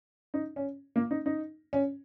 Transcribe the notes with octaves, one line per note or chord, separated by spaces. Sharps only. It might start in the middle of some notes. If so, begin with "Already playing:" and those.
D#4
C#4
A#3
D#4
D#4
C#4